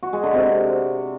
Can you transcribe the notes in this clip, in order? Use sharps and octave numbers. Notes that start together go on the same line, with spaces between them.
F#4
G#3
D3
C3